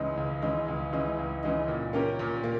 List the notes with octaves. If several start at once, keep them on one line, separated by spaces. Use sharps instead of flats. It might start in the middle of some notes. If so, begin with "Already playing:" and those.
Already playing: C#2 C#3 E3 G#3 D#4
C#2
C#3 E3 G#3 D#4
C#2
C#3 E3 G#3 D#4
C#2
C#3 E3 G#3 D#4
A#2
A#3 C#4 G4 A#4
A#2
A#3